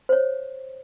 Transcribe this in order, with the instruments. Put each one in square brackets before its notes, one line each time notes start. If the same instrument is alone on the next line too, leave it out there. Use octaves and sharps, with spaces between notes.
[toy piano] C5 C#5